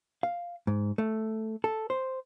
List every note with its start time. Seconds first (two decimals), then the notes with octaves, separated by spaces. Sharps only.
0.23 F5
0.67 G#2
0.98 A3
1.64 A4
1.90 C5